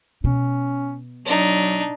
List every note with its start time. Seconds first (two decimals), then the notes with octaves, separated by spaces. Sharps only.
0.24 B2 C#4
1.26 F#3 D4 D#4